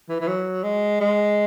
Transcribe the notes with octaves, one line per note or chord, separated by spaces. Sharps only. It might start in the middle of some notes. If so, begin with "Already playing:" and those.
E3
E3
F#3
G#3
G#3